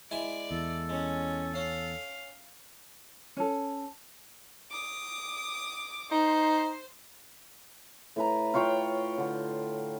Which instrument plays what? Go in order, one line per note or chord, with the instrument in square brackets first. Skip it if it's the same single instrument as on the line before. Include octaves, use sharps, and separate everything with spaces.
[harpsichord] G#3 E4 G#5 [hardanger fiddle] D5
[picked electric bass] E2 [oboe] A4
[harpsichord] G#3 [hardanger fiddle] C#4
[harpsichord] C#4 [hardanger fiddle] F5
[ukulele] C#4 A4
[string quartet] D6 D#6
[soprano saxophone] D#4 [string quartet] C5
[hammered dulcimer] A2 B4 A#5
F4 C#5 F5 G5
D3